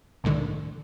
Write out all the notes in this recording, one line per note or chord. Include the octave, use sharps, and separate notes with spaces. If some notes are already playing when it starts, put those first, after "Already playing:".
C2 A2 D3 D#3